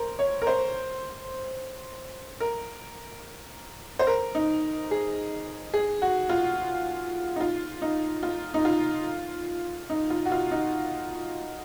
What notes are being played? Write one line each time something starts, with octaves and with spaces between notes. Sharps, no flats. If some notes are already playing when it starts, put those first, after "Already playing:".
Already playing: A#4 C5
C#5
A#4
C5
A#4
C5
A#4
D#4
G#4
G#4
F#4
F4
D#4
F4
D#4
F4
D#4
F4
D#4
F4
F#4
F4
D#4